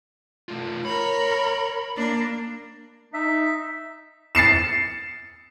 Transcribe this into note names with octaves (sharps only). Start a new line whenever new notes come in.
A3 F4
A#4 C#5 B5
A#3 D4
D#4 E5
A6 C7 C#7 E7